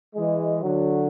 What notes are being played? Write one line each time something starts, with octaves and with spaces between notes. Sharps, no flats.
E3 G#3
D3 F#3